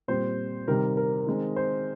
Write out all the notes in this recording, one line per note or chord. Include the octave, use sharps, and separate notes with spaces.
A#2 G3 C4 C5
C3 D#3 G3 A#4
A#4
D#3 G#3 C4
C5